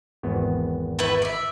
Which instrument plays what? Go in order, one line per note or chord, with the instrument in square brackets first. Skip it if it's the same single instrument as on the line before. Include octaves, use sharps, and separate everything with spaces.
[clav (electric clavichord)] G#1 E2 B3
[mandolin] A3 E4 B4
D5 E5